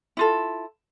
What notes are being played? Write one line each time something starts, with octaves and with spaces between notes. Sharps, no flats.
E4 F4 A4